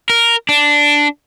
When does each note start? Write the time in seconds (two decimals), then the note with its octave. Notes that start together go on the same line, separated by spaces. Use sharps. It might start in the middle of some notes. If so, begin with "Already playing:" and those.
0.10 A#4
0.49 D4